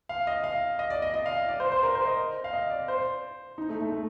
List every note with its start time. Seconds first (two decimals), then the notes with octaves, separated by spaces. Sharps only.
0.09 F5
0.27 D#5
0.44 F5
0.79 D#5
0.90 D5
1.02 D#5
1.14 D#5
1.26 F5
1.48 D5
1.60 C5
1.72 C5
1.83 A#4
1.95 C5
2.07 D#5
2.44 F5
2.53 D#5
2.70 D5
2.88 C5
3.58 D#4
3.69 A3
3.81 A3
3.92 A3